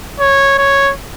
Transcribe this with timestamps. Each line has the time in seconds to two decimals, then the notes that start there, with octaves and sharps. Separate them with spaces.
0.20 C#5
0.59 C#5